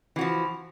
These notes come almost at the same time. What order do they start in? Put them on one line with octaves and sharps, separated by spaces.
E3 F#4 F3